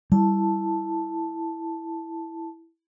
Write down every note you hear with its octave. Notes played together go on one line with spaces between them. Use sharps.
G3 E4 A5